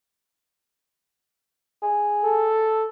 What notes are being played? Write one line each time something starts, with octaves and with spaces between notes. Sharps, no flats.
G#4
A4